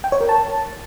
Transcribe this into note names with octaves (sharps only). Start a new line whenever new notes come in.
G5
C#5
A#4
A5